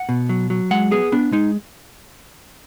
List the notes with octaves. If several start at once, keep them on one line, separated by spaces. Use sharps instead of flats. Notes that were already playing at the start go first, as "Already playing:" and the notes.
Already playing: F#5
B2
F#3
F#3
G#3 F#5
B3 G#4
B3 D4
G#3 D#4